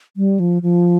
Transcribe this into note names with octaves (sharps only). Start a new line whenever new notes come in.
G3
F3
F3